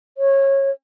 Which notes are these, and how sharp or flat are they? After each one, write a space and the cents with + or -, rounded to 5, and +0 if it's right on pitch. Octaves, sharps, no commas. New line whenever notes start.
C#5 -20